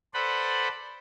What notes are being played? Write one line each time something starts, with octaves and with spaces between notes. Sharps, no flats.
A4 B4 C5 D5 F#5 B5